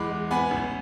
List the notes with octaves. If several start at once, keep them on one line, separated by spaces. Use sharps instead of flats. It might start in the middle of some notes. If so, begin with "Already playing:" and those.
Already playing: E2 G#3 B5 D6
G#3
B3 G#5 B5
A1